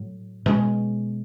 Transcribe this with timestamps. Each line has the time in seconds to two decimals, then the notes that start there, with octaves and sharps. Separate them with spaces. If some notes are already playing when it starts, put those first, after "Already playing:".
Already playing: A2 F#3
0.46 B2 G#3 C#4